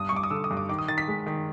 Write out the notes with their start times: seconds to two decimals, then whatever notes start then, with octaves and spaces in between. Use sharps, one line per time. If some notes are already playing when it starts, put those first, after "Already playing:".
Already playing: G2 D#6
0.09 C#6
0.12 G2 D6
0.23 D#6
0.31 D3 E6
0.44 D#6
0.51 G2
0.57 D6
0.69 D#3 D6
0.79 D#6
0.88 D#3 A6
0.98 B6
1.08 G#3
1.26 D#3